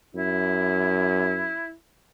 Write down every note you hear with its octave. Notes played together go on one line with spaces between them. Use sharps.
F#2 E4